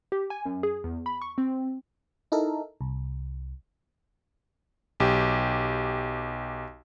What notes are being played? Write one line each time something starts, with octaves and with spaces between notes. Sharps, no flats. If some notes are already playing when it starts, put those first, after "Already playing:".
G4
G#5
F#2
G#4
E2
B5
C#6
C4
D#4 E4 A4 A#4
C2
B1 G4